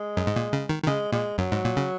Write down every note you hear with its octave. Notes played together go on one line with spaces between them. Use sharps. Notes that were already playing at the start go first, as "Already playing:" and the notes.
Already playing: G#3
F#2
G#2
A#2
C#3
D#3
D#3
C#3 G#3
A#2 G#3
F#2 F#3
G#2
A#2
C#3